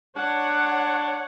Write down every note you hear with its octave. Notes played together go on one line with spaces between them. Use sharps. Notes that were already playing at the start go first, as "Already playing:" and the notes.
D4 C#5 F#5